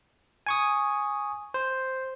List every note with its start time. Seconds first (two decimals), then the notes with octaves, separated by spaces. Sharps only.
0.46 G#5 C#6 D#6
1.54 C5